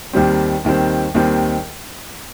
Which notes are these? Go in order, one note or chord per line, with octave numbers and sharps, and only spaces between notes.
D#2 D#3 G3 C4
D#2 D#3 G3 C4
D#2 D#3 G3 C4